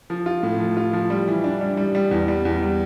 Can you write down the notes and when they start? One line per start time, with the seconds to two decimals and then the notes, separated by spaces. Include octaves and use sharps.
0.10 F3
0.26 F4
0.43 A2
0.60 F3
0.77 F4
0.93 F3
1.10 G3
1.27 E3
1.44 D4
1.61 G3
1.77 G3
1.95 G3
2.11 E2
2.28 G3
2.45 E2
2.62 G3